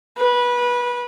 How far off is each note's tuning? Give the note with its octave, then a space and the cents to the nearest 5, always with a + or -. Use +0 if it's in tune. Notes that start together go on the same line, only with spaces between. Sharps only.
B4 -20